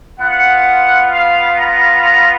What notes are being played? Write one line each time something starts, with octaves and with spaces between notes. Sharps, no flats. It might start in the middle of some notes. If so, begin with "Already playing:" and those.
B3 F4 F#5
F5
A#5
A#5